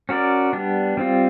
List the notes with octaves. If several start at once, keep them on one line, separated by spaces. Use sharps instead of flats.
C#4 F#4 A#4 D5
G3 B3 D4
G3 C4 F4